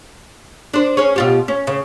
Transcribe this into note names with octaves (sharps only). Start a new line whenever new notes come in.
D4 C5
C#4 G#4 C#5
B2 F4 G4
C#4
C#3